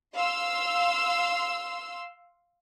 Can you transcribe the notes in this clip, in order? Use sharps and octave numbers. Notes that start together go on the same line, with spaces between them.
F5 C6 E6